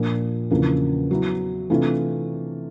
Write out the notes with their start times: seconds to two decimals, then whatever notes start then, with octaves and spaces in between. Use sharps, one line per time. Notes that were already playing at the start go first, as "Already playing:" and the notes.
Already playing: A#2 F3 A#3 D4
0.50 E2 C#3 F3 A#3 D4
1.11 F#3 B3 E4
1.70 C3 E3 A3 D4 F4